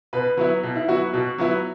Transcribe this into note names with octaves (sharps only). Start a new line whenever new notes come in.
B2 B4
F#3 B3 E4
B2
E4
F#3 B3 E4 F#4
B2 F#4
F#3 B3 E4